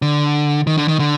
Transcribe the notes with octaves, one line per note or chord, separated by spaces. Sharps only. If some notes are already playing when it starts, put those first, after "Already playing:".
D3
D#3
D3
D#3
D3